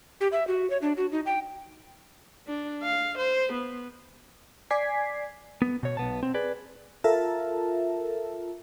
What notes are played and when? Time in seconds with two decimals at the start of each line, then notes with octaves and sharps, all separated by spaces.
0.21 G4
0.32 E5
0.47 F#4
0.70 C#5
0.82 D4
0.97 F#4
1.12 D#4
1.26 G5
2.47 D4
2.82 F5
3.18 C5
3.53 B3
4.70 D5 G#5 D6 G#6 B6 C7
5.62 B3
5.83 B2 C#5
5.97 B1 B3 A5
6.23 C4
6.34 G#4 B4 D5
7.04 F4 A4 A#4 E5 A5